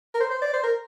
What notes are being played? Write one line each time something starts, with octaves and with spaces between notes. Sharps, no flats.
A#4
C5
C5
D5
C5
A#4